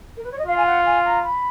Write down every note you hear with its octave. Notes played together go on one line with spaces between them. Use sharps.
A#4
B4
C#5
D#5
F4 F5
G#5
F#5
G#5
A#5
B5